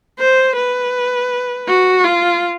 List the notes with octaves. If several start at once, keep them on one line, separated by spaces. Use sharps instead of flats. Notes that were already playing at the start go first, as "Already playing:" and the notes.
C5
B4
F#4
F4